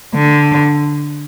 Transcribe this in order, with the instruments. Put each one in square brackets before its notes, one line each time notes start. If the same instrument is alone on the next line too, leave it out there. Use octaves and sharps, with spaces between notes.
[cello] D3